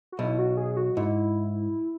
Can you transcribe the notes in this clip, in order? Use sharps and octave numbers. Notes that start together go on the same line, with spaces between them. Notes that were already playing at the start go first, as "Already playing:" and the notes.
F#4
B1 B2 E4
F#4
G#4
F#4
G#2 E4